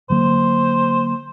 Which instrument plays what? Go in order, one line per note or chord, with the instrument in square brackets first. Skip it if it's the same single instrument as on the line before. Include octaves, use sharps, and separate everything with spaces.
[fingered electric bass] D3 F#3 A#3 [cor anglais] C5